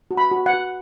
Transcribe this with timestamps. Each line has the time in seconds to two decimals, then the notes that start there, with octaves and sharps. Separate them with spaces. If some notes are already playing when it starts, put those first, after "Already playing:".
0.11 F#4
0.17 B5
0.31 F#4
0.46 F#5
0.53 F#4